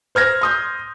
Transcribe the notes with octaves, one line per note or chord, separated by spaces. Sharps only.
C5 F6 G#6 A#6
C6 D#6 G6